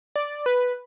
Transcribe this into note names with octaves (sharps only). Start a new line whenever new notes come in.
D5
B4